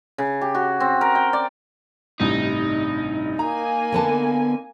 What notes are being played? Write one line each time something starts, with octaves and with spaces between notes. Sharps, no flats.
C#3
G4
F#4
C4
A#4
G5
D5
A1 G2 C3 D#4
A#3 G#5 A#5
D3 B3 A5